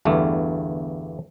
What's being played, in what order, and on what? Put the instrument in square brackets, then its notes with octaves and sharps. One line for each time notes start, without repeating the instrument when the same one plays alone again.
[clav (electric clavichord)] G1 E2 G2 A3